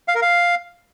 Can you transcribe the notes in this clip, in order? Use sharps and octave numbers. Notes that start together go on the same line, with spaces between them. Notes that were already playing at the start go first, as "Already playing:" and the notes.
F5
A#4
F5